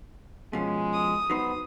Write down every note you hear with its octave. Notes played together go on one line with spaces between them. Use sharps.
B2 F3 G#3 C#4
D#6
F#3 B3 D#4 C5